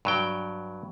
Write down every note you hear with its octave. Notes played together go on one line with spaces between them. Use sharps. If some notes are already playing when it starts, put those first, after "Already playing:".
G2 F#3 G5